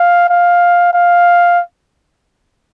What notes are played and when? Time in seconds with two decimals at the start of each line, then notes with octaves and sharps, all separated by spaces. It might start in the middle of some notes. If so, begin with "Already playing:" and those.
Already playing: F5
0.29 F5
0.94 F5